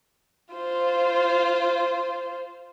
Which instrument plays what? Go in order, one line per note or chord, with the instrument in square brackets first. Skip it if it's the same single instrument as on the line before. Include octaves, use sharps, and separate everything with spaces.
[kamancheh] F4 C5